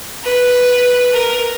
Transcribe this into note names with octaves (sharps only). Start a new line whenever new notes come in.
B4
A#4